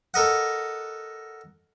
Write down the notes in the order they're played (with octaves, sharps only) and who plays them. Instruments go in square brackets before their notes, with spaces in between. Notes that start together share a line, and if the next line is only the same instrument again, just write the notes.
[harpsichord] A4 A#4 D#5 F#5